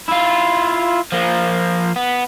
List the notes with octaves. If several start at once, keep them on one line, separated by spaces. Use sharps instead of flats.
E4 F4
F3 A#3
B3